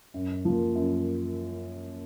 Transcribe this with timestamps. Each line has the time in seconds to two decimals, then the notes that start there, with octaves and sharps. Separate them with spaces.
0.14 F#2
0.45 F3 A#3
0.75 F#2